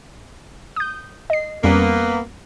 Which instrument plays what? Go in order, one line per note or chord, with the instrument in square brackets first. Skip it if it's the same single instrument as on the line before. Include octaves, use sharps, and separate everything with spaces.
[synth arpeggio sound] D#6 G6
D#5 C7
[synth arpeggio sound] F2 G3 C#4 [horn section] A#3 B3